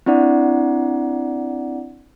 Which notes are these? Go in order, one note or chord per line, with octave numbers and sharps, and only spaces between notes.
C4 D4 E4 D5 F#5